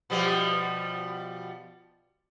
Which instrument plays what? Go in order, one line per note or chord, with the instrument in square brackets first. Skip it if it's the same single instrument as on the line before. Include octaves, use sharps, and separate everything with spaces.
[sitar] B2 F3 G3